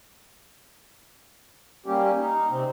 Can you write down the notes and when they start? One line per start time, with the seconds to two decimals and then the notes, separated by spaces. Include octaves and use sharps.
1.86 G3 A#3 C#4 G4
2.17 D#4
2.50 C3 C4